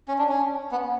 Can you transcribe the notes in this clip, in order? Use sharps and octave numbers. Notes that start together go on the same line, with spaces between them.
C#4
D4
C#4
B3